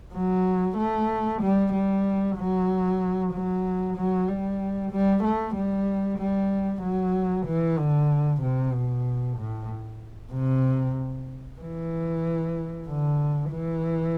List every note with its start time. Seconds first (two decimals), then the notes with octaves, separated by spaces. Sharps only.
0.15 F#3
0.78 A3
1.42 G3
1.74 G3
2.37 F#3
3.33 F#3
3.97 F#3
4.28 G3
4.91 G3
5.24 A3
5.56 G3
6.19 G3
6.83 F#3
7.46 E3
7.79 D3
8.42 C3
8.74 B2
9.38 A2
10.33 C3
11.60 E3
12.87 D3
13.51 E3